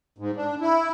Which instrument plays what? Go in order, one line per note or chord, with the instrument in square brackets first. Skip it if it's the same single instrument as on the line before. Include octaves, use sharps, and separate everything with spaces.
[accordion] G#2
D4
E4